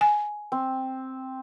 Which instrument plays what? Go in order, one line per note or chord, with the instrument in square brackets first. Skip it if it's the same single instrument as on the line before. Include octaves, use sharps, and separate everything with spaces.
[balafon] G#5
[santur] C4